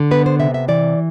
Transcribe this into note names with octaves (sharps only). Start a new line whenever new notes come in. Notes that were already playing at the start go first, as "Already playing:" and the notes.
Already playing: D3
B3 B4
C5
C3 E5
E5
E3 D5